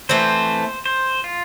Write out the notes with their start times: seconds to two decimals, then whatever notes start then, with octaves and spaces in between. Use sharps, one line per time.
0.09 E3 A3 C4 C5
0.86 C5
1.24 F4